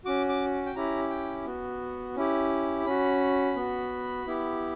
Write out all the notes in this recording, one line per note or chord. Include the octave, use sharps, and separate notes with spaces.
C#4 F#4 D6
D6
G5
C#4 E4 G4 A#5
G5
B3 F#4
C#4 E4 G4
C#4 F#4 B5
B3 F#4
B3 E4 G4